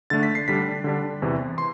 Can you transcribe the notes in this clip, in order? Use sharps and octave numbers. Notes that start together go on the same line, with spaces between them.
D3 A3 D4 A6
B6
C7
D3 G3 D4 B6
D3 G3 D4
E2 C3 E3
C6